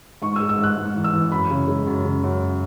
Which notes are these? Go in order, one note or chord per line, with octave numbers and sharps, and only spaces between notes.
G#2 C#6
G#3 E6
E6
G#2 F#6
G#2
E3
E6
E3
F#2 B5
C#3
G#3
F#2
C#3
F#2